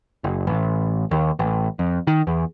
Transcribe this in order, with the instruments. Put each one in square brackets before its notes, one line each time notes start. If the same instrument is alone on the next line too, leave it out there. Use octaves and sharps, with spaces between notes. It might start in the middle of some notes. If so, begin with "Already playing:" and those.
[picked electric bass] F#1
A1
D#2
A1
F2
D#3
E2